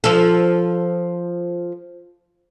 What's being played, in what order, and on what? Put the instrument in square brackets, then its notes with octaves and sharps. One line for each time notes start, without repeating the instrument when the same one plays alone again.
[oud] F3 A4